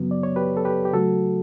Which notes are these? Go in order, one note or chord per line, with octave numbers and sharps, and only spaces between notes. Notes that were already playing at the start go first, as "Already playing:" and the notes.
Already playing: F#2 C#3 F#3 B3
D5
C#5
G4 B4
A4
G4 B4
G4
C#3 F#3 A3 F#4 A4